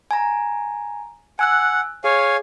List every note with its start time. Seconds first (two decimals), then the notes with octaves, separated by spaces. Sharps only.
0.11 G#5 A#5
1.39 F#5 G#5 E6 F#6
2.04 G#4 C#5 F5 G#5